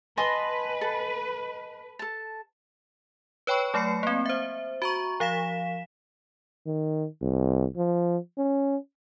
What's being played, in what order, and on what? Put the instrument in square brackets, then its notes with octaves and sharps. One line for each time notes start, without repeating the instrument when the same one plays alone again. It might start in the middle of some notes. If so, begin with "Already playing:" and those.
[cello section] B4 [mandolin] D#5 G#5 C6 [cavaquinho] A5 B5
[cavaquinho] A4
A4 A5
[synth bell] B4 C#5 G5 B5 C#6
F#3 A3 B5 C7 C#7
A#3 C4
C5 E5
F#4 A#5 C#6
F3 F5 B6 E7
[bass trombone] D#3
C2
F3
C#4